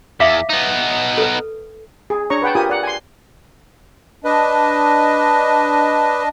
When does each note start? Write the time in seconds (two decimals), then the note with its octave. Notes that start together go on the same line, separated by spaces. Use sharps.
0.20 E2 E5 F5 D6
0.49 B3 D#4
1.17 A4 B4
2.10 G#4
2.30 D4 C#5 A#5 C#6
2.42 B4 F#5 G5 A5
2.55 F4 G4 A#4 G#5 D#6
2.70 D5 F#5
2.83 G#5 C6
4.24 D4 B4 D#5